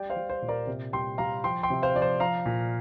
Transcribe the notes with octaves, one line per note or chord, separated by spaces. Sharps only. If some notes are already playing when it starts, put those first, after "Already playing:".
Already playing: G3 D5 G5
C5 F5
G3
C5
A#2
A#4 D5
C3
G3 G5 C6
G3 F5 A#5
F3 G5 C6
G5 C6
C3
C5 F5
F3 D5
C5
F3 F5 A#5
A#2